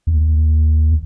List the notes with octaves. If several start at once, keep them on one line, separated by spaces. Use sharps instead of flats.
D#2